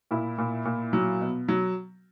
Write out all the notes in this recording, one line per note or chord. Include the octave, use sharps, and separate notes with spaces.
A#2 E4
A#2
A#2
F#3
B2
F#3